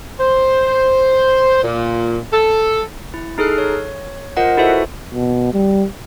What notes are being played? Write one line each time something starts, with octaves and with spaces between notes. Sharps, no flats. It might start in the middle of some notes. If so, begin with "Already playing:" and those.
C5
A#2
A4
E4
D#4 G#4 A4 F6 F#6 C7
C#5
F4 A#4 C5 D#5 F#5
E4 F#4 A4 B4 C5 E5
B2
G3